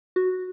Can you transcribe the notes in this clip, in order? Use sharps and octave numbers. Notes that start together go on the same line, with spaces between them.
F#4